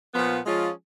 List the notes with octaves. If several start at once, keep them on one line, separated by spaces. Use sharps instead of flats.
A#2 F3 B3
F3 G#3 C#4 F4 G#4